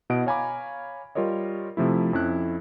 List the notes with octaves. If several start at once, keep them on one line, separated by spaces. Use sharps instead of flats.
B2 E4 D#5 F#5 D7
C#5 F5 G#5 A#5 B5 D6
G3 F4 A#4 C#5 D#5
C3 F3 A3 E4
F2 C#4 E4 F#6